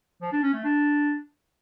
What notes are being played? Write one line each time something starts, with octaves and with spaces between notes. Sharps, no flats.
F3
D4
C#4
A3
D4